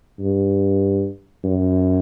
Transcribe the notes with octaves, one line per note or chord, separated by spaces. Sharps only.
G2
F#2